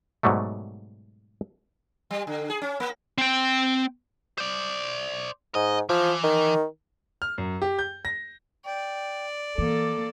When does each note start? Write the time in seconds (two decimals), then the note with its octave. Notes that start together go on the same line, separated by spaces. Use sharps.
0.23 G#2 B2 F#3 G3 A3
2.11 G3
2.27 D3
2.50 G#4
2.62 C#4
2.80 A#3
3.18 C4 G5
4.38 C5 D5
5.55 G#2 D#5
5.89 E3 F3
6.24 D#3
7.22 F6
7.38 F#2
7.62 G4
7.79 G6
8.05 A#6
8.65 D5 G5
9.58 E3 A#3 A4 D6